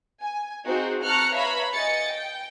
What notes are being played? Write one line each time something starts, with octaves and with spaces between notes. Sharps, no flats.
G#5
C4 D#4 F4 F#4 G#4 C5
A5 A#5 C#6 F6 F#6 C#7
B4 C#5 E5 F5 A#5 B5
D#5 G#5 A6 C#7
G5